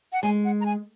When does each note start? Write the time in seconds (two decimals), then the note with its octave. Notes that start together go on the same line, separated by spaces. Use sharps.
0.12 F#5
0.23 G#3 G#5
0.45 F#5
0.61 A#5
0.66 G#5